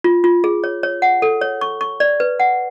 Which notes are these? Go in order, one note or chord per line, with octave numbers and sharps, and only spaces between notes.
F4
F4
G#4
C#5
C#5
F#5
A4
C#5
C#6
C#6
D5
B4
F#5